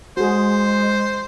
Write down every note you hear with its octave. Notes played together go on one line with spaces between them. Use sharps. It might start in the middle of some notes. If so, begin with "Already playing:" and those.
G#3 F#4 G#4 C5